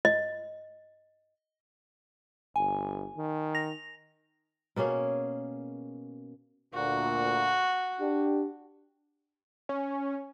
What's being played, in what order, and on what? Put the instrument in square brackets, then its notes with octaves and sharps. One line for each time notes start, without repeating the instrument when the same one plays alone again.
[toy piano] D#5
[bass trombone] G1 [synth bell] G#5
[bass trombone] D#3
[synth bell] A#6 F7
[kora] B2 A#3 C#4 G#4
[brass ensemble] D2 A#2 [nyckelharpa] F#4
[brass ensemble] D4 G4
[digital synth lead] C#4